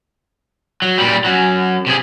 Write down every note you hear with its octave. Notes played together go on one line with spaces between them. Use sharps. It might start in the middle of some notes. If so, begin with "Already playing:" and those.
F#3
A#2 G3
F#2 F#3
C3 G#4